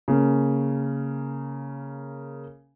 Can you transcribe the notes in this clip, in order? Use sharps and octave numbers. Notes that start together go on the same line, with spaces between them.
C#3 A#3